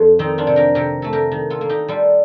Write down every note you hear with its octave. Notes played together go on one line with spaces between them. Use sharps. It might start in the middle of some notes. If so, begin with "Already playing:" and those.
Already playing: F2
D#3 C4 D#4
D4 F4
C3
G4 A#4
C3 G4 A#4
A3 A4
G4 A#4
D#3
F4 A4
A#3
D#4 G4
G3 F4 A4